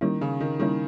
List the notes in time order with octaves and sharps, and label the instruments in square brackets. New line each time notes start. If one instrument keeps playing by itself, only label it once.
[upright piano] D#3 [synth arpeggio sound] G3 A#3 C#4 E4
[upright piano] C#3
D#3
[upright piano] D#3 [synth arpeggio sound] G3 A#3 C#4 E4